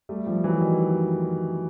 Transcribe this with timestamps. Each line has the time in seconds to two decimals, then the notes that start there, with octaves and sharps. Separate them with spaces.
0.09 G3 A3
0.26 F3 G3
0.44 E3 F#3
0.61 D#3